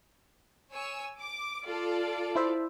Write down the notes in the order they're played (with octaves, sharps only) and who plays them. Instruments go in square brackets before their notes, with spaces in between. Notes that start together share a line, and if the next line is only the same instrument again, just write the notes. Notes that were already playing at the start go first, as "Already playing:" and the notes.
[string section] C#5 G#5 E6
D6
F4 A4 D5
[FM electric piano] E4 C5 E5